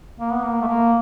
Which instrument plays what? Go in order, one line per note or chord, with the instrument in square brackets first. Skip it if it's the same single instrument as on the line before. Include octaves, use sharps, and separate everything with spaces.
[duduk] A#3
B3
A#3
A3
A#3